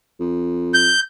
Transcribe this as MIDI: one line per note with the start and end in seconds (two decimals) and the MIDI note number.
0.20 0.91 41
0.74 1.00 91